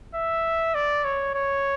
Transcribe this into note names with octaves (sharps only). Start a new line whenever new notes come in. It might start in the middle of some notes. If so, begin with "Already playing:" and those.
E5
D5
C#5
C#5